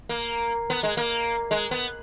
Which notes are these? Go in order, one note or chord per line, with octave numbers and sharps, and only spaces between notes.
A#3
B3
G#3
A#3
G#3
B3